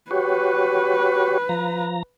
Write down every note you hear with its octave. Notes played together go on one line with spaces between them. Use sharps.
F#4 G4 B4 C#5
F3 A#5